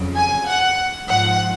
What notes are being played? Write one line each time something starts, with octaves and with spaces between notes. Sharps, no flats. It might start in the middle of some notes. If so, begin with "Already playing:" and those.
Already playing: F2 C#3 F#3
G#5
F#5
G#2 F3 F#5